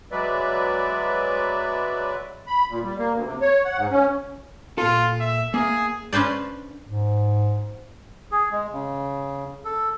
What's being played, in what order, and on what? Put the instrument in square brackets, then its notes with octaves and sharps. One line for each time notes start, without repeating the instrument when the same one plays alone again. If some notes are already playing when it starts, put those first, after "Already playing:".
[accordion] F#3 G#3 B4 D5 E5
B5
A#2
G3
A#3
D2
C3
C#5
F#5
G#2
C#4
[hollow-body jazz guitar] A#2 A4 [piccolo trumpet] F4
[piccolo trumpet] E5
[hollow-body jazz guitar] A#3 E5 [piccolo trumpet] G#4
[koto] C#4 D4 B4 C5 D5
[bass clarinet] G#2
[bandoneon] G#4
G#3
C#3
A4